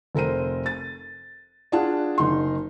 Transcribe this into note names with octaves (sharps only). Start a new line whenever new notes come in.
F1 A4 A#4 C5 D#7
A6
D4 F4 G#4 F#5 A5
F#1 D#4 C6